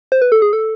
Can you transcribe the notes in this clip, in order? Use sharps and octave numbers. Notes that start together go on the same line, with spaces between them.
C5
B4
A4
G#4
A4